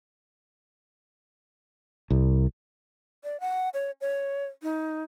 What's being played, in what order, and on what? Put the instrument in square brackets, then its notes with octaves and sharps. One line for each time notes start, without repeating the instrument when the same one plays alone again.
[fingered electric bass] C2
[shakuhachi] D5
F#5
C#5
C#5
D#4